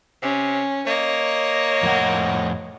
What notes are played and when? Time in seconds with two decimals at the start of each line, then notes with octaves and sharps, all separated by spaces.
0.23 C3 C#4
0.87 A#3 C#5 D#5
1.83 F2 A2 F#5